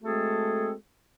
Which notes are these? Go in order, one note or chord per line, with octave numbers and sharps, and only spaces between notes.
G#3 A3 C4 F#4 G#4 A4